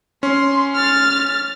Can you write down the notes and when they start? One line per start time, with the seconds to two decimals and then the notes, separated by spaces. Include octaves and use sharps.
0.23 C#4 C6
0.75 F6 A6